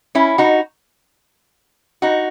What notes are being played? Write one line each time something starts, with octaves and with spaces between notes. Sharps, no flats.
C#4 E4
D#4 F#4
D#4 F#4